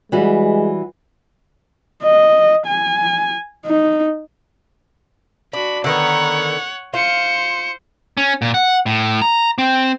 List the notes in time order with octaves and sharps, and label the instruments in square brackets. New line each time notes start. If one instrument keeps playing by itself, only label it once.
[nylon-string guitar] E3 G3 F#4 [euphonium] G#3
[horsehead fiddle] D#5
G#5
D#4
[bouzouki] D4 [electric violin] F#4 B5
[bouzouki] D3 D#3 B3 [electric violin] C#5 F#5
[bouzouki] F4 [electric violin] C5 C#7
[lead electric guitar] C#4
A#2
F#5
A2
A#5
C4